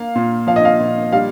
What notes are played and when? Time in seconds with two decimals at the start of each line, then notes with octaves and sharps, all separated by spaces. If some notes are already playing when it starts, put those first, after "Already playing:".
Already playing: A#3 F5
0.15 A#2
0.47 F3 F5
0.56 D#5
0.65 F5
0.80 A#2
1.12 G3 F5